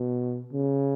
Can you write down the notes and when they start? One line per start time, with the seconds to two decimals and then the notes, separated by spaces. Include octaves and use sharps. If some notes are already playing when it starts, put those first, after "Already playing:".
Already playing: B2
0.53 C#3